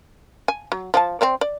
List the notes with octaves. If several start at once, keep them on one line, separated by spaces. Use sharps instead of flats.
G#5
F#3
F3 G5 A5
C4 C5 D5
D5